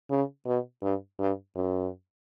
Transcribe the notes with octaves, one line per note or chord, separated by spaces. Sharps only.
C#3
B2
G2
G2
F#2